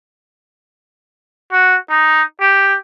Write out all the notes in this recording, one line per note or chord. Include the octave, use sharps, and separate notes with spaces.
F#4
D#4
G4